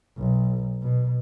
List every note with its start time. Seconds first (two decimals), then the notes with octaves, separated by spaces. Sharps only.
0.17 B1
0.82 B2